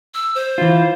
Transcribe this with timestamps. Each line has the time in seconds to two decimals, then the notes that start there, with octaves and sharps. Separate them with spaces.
0.14 E6
0.35 C5
0.58 E3 F4